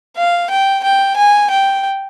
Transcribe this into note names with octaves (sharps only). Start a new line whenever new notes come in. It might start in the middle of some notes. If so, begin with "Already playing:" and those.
F5
G5
G5
G#5
G5